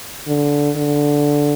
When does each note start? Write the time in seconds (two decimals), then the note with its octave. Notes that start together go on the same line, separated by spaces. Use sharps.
0.28 D3
0.77 D3